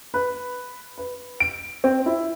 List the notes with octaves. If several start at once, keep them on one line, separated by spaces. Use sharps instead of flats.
B4
B4
D7
C4
E4